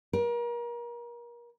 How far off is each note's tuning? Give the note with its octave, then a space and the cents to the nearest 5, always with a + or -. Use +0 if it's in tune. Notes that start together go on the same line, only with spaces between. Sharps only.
A#4 +35